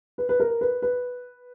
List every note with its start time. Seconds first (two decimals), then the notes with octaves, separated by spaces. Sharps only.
0.18 B4
0.29 B4
0.40 A#4
0.61 B4
0.82 B4